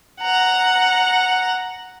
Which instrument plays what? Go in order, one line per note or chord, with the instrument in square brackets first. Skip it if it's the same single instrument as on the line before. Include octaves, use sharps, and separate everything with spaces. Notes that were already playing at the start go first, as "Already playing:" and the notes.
[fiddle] F#5 A#5